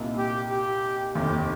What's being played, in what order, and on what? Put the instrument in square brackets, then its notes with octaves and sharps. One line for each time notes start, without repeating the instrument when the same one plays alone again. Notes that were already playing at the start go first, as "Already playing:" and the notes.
Already playing: [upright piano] C2 A#2 A#3 D#4
[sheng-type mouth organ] G4
G4
[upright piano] F1 D#2 D#3 [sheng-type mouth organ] G4
[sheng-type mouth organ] G4